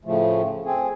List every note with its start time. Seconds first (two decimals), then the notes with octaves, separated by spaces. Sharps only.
0.05 A2 C#3 F3 A3
0.65 C4 G#4